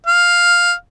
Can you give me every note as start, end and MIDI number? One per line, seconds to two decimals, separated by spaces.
0.06 0.73 77